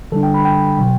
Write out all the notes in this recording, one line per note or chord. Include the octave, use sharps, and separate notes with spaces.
D3 G3 D4 A4
G5
B5
G5
B2 F#3